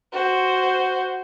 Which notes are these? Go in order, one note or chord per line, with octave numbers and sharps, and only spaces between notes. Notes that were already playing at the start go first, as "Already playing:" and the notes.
F#4 C5